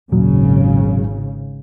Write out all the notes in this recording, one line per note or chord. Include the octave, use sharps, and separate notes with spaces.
G#1 D#2 A#2 C#3 F#3